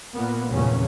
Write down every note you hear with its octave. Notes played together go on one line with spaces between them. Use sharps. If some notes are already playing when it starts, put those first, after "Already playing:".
A#2 A#3 B3
F1 E2 G2 A#2 C#3 C#4